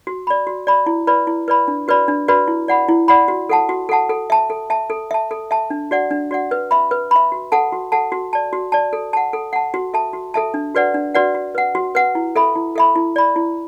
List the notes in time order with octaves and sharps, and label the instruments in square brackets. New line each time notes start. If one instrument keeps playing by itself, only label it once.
[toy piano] F#4
D5 B5
F#4
D5 B5
E4
B4 D5 B5
E4
B4 D5 B5
D4
F#4 B4 D5 B5
D4
F#4 B4 D5 B5
E4
D5 F#5 B5
E4
D5 F#5 B5
F#4
A4 F#5 A5
F#4
A4 F#5 A5
A4
E5 A5
A4
E5 A5
A4
E5 A5
A4
E5 A5
D4
F#4 D5 F#5
D4
F#4 D5 F#5
B4
E5 B5
B4
E5 B5
F#4
A4 F#5 A5
F#4
A4 F#5 A5
F#4
D5 A5
F#4
D5 A5
A4
F#5 A5
A4
F#5 A5
F#4
A4 E5 A5
F#4
A4 E5 A5
D4
F#4 B4 D5 F#5
D4
F#4 B4 D5 F#5
F#4
B4 F#5
F#4
B4 F#5
E4
A4 E5 B5
E4
A4 E5 B5
E4
D5 B5
E4